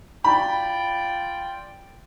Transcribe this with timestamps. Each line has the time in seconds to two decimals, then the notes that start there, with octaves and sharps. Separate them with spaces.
0.24 F4 D5 G5 B5